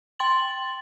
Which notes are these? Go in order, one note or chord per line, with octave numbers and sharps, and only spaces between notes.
G5 C6 A6 F#7